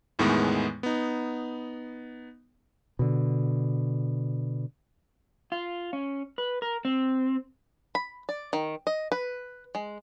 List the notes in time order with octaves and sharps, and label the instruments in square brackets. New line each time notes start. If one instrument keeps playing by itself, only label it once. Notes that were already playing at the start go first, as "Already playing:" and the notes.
[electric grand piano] E2 A2 D#3 E3 G#3 B3
B3 D#4
[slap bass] B2 D3
[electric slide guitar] F4
C#4
B4
A#4
C4
[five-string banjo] B5
D5
D#3
D#5
B4
G#3